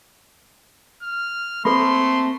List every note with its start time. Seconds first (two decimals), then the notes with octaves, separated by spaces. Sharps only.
1.03 F6
1.65 A3 A#3 C4 A4 B5 C6